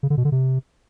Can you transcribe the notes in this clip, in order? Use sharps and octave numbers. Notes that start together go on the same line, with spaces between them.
C#3
D3
B2
D3
C3